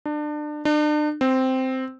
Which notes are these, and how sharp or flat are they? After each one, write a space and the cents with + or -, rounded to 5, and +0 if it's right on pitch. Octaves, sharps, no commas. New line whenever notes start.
D4 +30
D4 +40
C4 -5